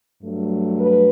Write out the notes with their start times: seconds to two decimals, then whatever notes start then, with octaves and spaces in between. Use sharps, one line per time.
0.21 G2 F#3 A3
0.80 B4